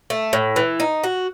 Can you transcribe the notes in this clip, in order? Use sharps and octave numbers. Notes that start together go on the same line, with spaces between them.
A3
A2
E3
D#4
F#4